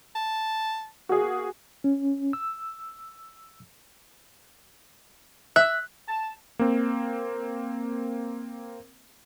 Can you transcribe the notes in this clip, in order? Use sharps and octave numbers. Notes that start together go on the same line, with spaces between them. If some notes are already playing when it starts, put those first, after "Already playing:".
A5
A#3 F#4 G#4
C#4
E6
E5 F#6
A5
A#3 C4